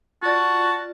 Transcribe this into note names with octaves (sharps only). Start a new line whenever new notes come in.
F4 F#4 D5 A5